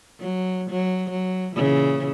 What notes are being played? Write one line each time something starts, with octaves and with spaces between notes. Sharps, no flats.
F#3
F#3
F#3
A#2 C#3 E3